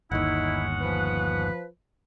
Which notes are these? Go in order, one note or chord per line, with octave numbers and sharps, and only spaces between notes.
G1 D#2 G#3 C#4 D#4 E4 F#5
F3 B4